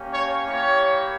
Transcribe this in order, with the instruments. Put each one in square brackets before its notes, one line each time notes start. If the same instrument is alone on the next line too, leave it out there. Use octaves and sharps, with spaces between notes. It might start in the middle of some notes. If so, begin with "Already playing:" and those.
Already playing: [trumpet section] A#3 C#4 G4
C#5
A#3 E4 G4 C#5